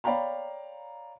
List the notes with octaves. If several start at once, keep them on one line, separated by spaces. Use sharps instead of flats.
C#5 D5 F5 G5 A#5 B5